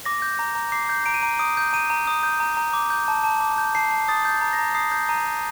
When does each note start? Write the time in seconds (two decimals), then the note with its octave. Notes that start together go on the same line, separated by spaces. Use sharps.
0.06 D6 A#6
0.22 G6
0.39 A#5
0.55 A#5
0.72 D6 C7
0.89 G6
1.06 A#5 D7
1.14 D#7
1.22 A#5 D7
1.39 D#6 D7
1.57 G6
1.73 A#5 D#7
1.90 A#5
2.07 D#6
2.23 G6
2.40 A#5
2.57 A#5
2.73 D6
2.90 G6
3.08 A5
3.24 A5
3.41 D6
3.58 G6
3.75 A5 C7
3.91 A5
4.08 D#6 A6
4.25 G6
4.30 A6
4.41 A#5
4.53 A#5 A#6
4.75 D#6 C7
4.92 G6
5.09 A#5 D#7
5.26 A#5